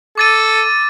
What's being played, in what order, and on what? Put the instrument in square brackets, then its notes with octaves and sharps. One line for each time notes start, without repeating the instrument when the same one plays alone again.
[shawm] A4 [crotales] D6 A6 D#7